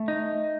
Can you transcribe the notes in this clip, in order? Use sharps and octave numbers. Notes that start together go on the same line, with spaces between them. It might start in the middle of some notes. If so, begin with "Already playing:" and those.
Already playing: A3
D#4